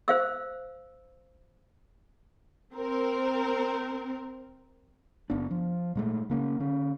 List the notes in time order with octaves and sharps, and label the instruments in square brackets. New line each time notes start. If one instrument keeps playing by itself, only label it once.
[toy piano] C5 F5 E6
[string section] C4 A#4
[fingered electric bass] F#1 B3 D4
F3
A#2 G#3 A3
C#3 A#3 C#4
D3 C#4